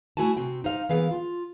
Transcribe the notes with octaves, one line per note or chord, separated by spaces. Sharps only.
A3 E4 F#4 G#5 A5
C3 C4 F#4 G5
D#4 C5 F5
E3 A#3 B3 G#4 F5
F4